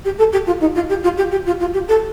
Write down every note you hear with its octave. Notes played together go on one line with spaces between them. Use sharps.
G4
A4
G4
F4
D#4
F4
G4
F4
G4
G4
F4
F4
G4
A4